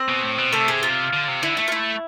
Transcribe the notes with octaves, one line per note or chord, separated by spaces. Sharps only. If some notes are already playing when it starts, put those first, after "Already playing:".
Already playing: C4 C5
B2
A2
B2
C3 A3 A4
G#4
F4
D3
C3
D3 E4
A3 E4
F4
E4